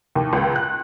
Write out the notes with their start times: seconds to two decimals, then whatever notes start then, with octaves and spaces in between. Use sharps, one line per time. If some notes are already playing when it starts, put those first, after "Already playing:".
0.15 D#2
0.33 C#2
0.56 F#6